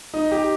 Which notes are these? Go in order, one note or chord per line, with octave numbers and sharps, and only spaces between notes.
D#4
G4